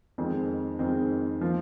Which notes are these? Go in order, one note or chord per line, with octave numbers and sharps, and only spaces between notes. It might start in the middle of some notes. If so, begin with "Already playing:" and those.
F2 D#3 G#3 C4
F2 D#3 G#3 C4
F3 A#3 F4